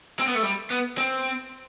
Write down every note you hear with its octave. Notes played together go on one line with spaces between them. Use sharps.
C4
B3
A3
G3
B3
C4